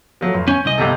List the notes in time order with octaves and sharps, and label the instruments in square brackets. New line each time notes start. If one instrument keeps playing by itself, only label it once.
[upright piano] F3 F#3 A3
F1
[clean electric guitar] C#4 [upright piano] G#5 G6
[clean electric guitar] C2 D#5
[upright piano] G1 C3 A4